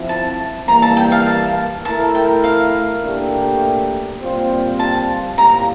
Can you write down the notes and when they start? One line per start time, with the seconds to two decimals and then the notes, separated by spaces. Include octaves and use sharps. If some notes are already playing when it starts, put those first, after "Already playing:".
Already playing: F3 C4 E4
0.09 A5
0.68 E3 G3 A#3 A#5
0.82 A5
0.97 G5
1.12 F5
1.26 A5
1.85 A3 E4 A#4 A5
2.15 G5
2.44 F5
3.02 A#2 A3 D4 G4 A#4
4.20 A#2 G3 C4 F4 C5
4.80 A5
5.38 A2 G3 A#3 A#5